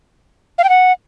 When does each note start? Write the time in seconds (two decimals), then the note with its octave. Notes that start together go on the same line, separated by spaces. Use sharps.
0.58 F5
0.64 G5
0.69 F#5